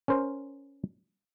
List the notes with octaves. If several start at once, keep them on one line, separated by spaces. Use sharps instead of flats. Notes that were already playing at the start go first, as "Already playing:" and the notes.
C#4 A#4 C5